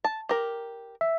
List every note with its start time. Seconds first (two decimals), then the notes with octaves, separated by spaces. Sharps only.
0.04 A5
0.29 G4 A#4
1.01 E5